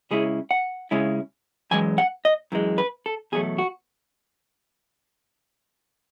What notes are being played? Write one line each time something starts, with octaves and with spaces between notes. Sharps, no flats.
C#3 G#3 C#4 E4 G#4
F#5
C#3 G#3 C#4 E4
F#2 E3 G#3 G#5
F#5
D#5
F#2 E3 G#3
B4
A4
E2 B2 F#3 A3 G#4
F#4